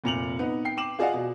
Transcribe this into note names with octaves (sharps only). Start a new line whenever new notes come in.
F1 A#2 F7 F#7
B3 D#4
G5 C7
G5 D6 E7 F#7
F4 G#4 D5 D#5 F5 F#5
B2